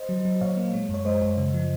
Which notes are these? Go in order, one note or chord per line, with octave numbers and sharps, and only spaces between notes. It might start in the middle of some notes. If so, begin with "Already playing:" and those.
Already playing: C5 D#5
F#3
F#3
A#2 C#5 F5
A#3
G#3
F#2
C#5
G#3 C5 D#5
F#2
C#3
F3